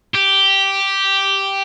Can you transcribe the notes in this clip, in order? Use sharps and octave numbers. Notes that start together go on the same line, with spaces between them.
G4